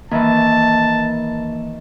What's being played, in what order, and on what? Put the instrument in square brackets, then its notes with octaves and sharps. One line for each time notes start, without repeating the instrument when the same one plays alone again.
[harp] D#3 E3 [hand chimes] A#3 [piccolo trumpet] A5